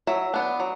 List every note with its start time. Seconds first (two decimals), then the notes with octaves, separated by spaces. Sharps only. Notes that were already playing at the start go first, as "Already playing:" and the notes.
0.07 F#3 E5
0.34 B3 D4
0.60 F#3